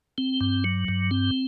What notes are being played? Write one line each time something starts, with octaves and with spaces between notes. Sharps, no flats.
C4
G2
F#3
G2
C4